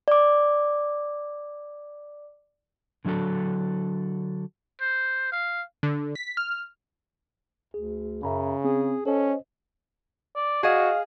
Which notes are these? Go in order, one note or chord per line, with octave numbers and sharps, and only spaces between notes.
D5 D6
D3 F#3 D4 F#4 A4
C5
F5
D3
B6
F6
D2 G#4
F#2 C#3 E5 A#5 B5
C4 G#4
C#4 A4 C5 D#5
D5
F#4 G#4 D#5 F5